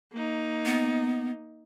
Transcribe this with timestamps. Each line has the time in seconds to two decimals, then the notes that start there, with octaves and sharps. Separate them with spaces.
0.13 A#3 D#4
0.65 B3